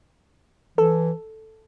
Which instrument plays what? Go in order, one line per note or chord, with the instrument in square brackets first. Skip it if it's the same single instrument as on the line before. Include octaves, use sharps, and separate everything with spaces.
[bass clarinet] E3 [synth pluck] A4